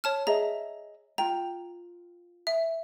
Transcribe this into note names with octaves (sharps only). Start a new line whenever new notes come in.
C#5 A5 F6
G#4 D#5 E5 A#5
F4 G5 A#5
E5